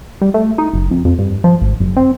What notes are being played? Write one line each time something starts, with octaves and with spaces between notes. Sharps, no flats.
G3
A3
D#4
F#1
F2
F2
G2
F3
G#1
F#1
C4